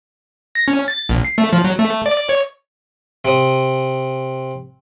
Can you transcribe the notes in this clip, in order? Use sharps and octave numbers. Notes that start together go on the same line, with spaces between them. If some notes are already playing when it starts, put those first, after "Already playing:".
A#6
C#4
A6
A#1
C7
A3
F3
F#3
A3
D5
C#5
C3 D#6